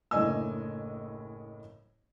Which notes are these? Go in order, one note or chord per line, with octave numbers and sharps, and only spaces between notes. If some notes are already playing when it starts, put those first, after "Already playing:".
F#1 A2 D4 D#5 G#5 E6